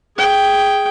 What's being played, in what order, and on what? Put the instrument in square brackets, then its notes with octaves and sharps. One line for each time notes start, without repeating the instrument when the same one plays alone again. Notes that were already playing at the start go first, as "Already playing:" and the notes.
[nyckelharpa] G#4 G5